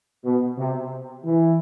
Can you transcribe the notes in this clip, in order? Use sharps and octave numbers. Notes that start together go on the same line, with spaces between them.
B2
C3
E3